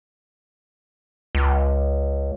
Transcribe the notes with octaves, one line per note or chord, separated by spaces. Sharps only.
C#2